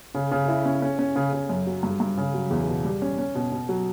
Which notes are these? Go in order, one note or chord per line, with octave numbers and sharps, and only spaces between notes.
C#3
C#3
E4
C#4
C#4
C#4
C#3
C#3
F#2
F#3
G2
G2
C#3
F#3
E2
B2
G3
C#4
C#4
B2
B2
F#3